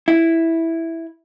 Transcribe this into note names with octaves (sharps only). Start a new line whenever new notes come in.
E4